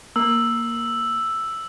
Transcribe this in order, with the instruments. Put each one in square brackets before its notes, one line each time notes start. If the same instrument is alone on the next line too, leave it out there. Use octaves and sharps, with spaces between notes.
[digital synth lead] A#3 [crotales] E6